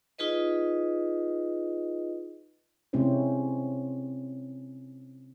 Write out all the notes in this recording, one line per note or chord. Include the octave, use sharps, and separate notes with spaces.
D#4 F4 G#4 B4 D#5
C3 G#3 C4 C#4 E4 C5